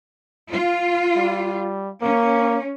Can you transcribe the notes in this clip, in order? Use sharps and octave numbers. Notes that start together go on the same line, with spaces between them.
F4
G3
A#3 C#4